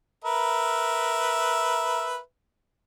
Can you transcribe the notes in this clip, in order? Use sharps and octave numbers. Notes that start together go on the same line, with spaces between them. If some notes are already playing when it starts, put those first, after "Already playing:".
A#4 B4 E5